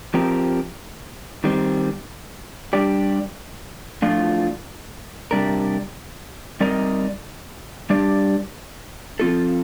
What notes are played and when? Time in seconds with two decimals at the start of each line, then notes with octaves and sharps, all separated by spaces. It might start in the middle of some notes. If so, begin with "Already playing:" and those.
0.14 F3 C4 G4 A#4
1.44 D#3 G3 C4
2.73 G3 D4 G4 D5
4.02 A2 F3 A3 D4 F4
5.31 C3 G3 D4 G4 A#4
6.61 G3 C4 D#4 A#4 D5
7.90 G3 D4 G4 D5
9.20 F3 C4 F4 A4